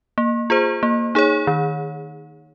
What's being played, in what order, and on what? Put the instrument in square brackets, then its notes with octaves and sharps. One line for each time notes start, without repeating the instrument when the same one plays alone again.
[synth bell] A#3
F4 G#4 C5
A#3
D#4 G#4 C#5
D#3